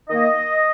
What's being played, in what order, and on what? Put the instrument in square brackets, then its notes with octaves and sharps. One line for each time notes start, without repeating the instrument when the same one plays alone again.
[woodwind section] D#3 A#3 D#5